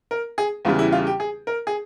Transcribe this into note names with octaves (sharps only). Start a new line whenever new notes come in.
A#4
G#4
E2 C#3 E3 G3 F4
E4
F4
G4
G#4
A#4
G#4